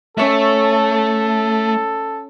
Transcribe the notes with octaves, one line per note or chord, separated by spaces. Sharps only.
A3 C#4 A4 C#5 E5